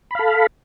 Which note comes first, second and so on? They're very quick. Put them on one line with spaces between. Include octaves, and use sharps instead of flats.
B5 F5 A4